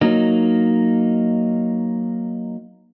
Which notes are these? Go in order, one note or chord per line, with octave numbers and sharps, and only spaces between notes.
F#3 A#3 D#4